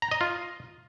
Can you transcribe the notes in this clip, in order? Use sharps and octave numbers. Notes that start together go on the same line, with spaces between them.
A#5
D#5
F4